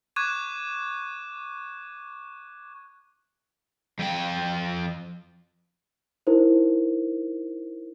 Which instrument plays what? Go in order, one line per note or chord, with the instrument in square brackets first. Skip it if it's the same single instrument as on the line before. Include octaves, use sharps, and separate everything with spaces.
[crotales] C#6 D6 F#6 G#6 D#7 E7
[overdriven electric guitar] F2 G5
[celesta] D#4 E4 A#4 C5